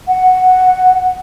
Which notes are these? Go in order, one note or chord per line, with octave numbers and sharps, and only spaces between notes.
F#5